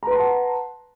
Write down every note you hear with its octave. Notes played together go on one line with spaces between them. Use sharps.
B4 F#5 A5 A#5 C6